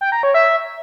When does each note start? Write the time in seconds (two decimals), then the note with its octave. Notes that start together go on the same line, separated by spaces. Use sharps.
0.01 G5
0.12 A#5
0.23 C#5
0.34 E5